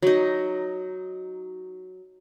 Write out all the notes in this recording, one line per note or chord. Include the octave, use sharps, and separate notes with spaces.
F#3 D#4